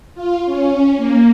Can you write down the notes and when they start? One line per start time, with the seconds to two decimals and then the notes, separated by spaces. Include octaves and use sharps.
0.15 F4
0.45 C#4
0.97 A#3